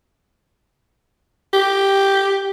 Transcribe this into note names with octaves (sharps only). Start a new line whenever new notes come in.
G4